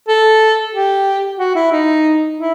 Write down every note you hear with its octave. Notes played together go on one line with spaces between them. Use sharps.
A4
G4
F#4
E4
D#4
E4